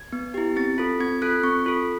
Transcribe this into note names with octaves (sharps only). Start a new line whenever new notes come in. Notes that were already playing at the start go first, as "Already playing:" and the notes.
Already playing: G#6
B3
E4 G4
C4 A6
F4 A4
C4 G#6
F4 A4 F#6
C4 C#6
F4 A4